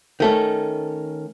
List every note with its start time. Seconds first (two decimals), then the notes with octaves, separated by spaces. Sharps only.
0.20 D#3 A3 C#4